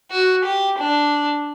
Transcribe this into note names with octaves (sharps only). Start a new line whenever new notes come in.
F#4
G4
D4